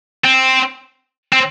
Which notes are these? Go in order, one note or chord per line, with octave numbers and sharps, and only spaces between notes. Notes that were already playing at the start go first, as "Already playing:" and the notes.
C4
C4